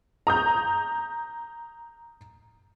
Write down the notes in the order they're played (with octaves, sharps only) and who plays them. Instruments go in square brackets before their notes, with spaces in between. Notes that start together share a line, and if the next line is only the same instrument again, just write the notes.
[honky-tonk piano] A#5 D#6 G6